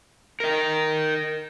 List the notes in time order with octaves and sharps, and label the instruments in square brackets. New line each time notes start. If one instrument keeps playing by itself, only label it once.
[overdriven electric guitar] A#4 D#5